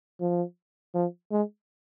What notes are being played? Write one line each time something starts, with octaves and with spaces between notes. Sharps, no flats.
F3
F3
G#3